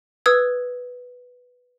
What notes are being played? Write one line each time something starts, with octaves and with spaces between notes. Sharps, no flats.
B4 D#6 E6 G#6